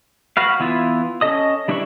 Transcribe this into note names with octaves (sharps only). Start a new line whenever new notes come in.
F#4 B4 F5
E3 B3 E4 F4
C#4 A4 D#5 D#6
G3 D4 E4 B4 C#6